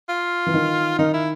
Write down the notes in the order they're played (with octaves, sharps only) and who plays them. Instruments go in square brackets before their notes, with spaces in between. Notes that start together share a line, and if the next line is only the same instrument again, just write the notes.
[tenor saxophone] F4
[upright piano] E3
D#3
[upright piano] D#3 [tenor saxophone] D#4
[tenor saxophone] E4